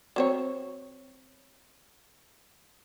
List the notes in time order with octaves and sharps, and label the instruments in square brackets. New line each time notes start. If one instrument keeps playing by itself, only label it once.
[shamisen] F#3 C4 C#5